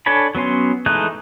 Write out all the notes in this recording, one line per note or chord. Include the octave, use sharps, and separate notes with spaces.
D4 A4 C#5 G#5 B5
F#3 B3 C#4 C6
E3 G#3 A3 D#4 F#6